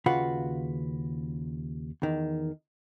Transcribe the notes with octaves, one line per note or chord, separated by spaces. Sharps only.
D#2 C#3 F4 F#4 B4 F#5
E2 D#3